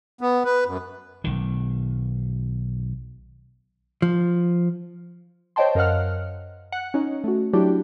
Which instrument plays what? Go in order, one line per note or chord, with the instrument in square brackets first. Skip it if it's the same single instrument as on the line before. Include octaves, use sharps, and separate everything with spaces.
[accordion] B3
B4
F#2
[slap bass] B1 D#3
[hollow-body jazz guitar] F3
[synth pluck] C5 C#5 D#5 G5 A5 C6
F#2 A#4 D#5 F5 F#5 F6
F#5
C#4 D#4
A3 F#4
F#3 D4 E4 F#4 G4